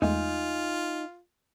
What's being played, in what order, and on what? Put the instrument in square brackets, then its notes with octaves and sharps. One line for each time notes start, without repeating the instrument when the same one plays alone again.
[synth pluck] E2 G#3 A3 [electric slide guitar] D#4 G#5 [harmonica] F4